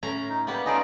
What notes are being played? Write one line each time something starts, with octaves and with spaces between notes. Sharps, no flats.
A2 C#4 A#5
D#4
G3 A#3 B3 G4
A3 C#4 D#4 F4 D5 D#5